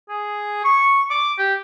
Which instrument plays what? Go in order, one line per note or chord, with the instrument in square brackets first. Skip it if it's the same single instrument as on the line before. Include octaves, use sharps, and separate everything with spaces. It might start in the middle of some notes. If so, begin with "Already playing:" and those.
[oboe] G#4
C#6
D6
G4